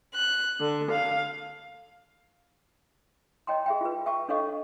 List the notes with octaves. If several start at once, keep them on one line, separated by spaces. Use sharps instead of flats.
F#6
D3
F5
C#5 D#5 G5 A#5 C6
G#4 E5 G5
F4 B4
E5 G5 A5 C#6
D4 A4 C#5 D#5 F5 C#6